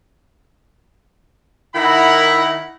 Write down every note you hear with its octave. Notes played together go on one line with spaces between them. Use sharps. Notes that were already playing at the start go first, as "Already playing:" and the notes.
D#3 E4 A#4 F#5 A#5 B5